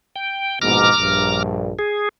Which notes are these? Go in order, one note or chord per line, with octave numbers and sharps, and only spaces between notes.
G5
A#1 G#2 B2 A#5 D6 F6
A#1 G2
G#4